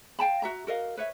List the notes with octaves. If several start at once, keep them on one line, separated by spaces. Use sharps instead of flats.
F5 G5 A5 B5
F#4 E5 A#5
F#4 A#4 D#5 F5
B4 C#5 E5